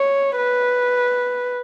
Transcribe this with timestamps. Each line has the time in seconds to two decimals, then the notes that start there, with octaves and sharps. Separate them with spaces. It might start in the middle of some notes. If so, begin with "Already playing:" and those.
Already playing: C#5
0.37 B4